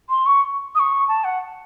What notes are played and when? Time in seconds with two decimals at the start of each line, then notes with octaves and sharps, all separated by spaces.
0.10 C6
0.26 C#6
0.75 D#6
0.79 C#6
1.08 A5
1.24 F#5